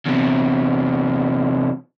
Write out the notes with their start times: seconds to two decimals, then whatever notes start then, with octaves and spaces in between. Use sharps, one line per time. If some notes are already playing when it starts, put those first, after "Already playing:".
0.06 E2 C3